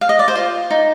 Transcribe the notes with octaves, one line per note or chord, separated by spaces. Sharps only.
F5
D#5
D5
C5
F4
D#4